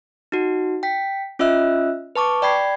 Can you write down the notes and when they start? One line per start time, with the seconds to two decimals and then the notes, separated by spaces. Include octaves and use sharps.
0.32 D#4 F#4
0.83 G5 B6
1.39 C#4 F4 D#5 E5 E6 F#6
2.16 B4 A5 C#6 D6
2.42 D5 G5 B5 G#6 C7